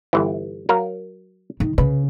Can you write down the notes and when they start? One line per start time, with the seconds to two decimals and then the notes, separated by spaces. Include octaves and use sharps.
0.13 G1 E3
0.69 F#3 A#4 F5
1.60 D#3
1.78 C#3 B4